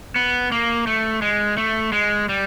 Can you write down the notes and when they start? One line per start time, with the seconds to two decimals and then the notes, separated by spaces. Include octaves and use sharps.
0.16 B3
0.52 A#3
0.87 A3
1.22 G#3
1.58 A3
1.92 G#3
2.29 G3